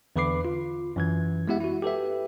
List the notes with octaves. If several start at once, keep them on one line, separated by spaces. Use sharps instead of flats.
E2 D3 B4 B5 D6 C7
F4
F#2 E3 G#6
G#3 B3 E4 G4 E5 F#5
E4 F#4
G4 A4 B4 E5